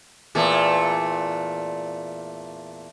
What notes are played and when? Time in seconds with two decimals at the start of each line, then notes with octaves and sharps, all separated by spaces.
0.35 E2 A#2 A3